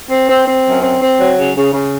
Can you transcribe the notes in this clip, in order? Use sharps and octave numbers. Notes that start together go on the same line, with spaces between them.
C4
C4
C4
F#2
C4
C4
F#3
C#3
C#3
C#3